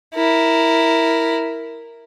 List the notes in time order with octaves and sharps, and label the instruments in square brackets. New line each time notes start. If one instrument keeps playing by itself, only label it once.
[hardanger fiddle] E4 A#4